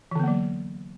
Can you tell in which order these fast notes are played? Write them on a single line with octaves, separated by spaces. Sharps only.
E3 D3 B3 A#3 F#3